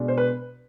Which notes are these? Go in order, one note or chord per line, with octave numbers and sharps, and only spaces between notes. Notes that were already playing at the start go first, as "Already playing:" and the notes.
Already playing: B2 G#3 D4
C5
B4